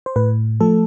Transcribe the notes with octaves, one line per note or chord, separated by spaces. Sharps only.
C5
A2 B4
F3 A3 A4